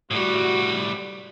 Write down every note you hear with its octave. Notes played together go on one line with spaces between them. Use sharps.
A2 G3 F#4